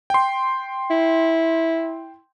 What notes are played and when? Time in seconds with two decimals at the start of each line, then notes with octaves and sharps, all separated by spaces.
0.10 G5 C6
0.90 E4